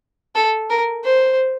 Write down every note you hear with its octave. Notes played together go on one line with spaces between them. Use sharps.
A4
A#4
C5